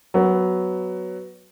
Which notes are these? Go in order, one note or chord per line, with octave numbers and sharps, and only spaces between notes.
F#3 B3